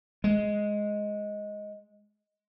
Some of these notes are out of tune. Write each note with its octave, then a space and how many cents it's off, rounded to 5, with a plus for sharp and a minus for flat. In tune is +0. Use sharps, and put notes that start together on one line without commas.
G#3 +5